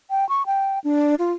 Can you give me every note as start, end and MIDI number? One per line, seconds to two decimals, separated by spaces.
0.10 0.27 79
0.29 0.45 85
0.46 0.79 79
0.84 1.15 62
1.19 1.32 65